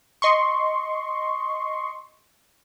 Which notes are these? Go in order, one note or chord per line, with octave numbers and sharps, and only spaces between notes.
D#5 C6 C#6